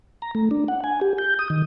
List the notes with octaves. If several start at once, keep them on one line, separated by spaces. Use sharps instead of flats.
A#5
A3
D4
F#5
G#5
G4
G6
D#6
D#3